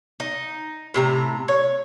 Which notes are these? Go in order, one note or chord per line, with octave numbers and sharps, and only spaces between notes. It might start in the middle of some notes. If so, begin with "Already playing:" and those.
D#4
A2 C3 A#5
C#5